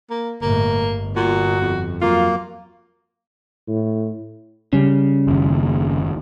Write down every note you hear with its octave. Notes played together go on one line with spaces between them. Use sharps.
A#3
G1 A2 A#3
G1
A#2 F#4
F2
F#3 A#3 F4
A2
C#3 G3 C#4
F#1 D#2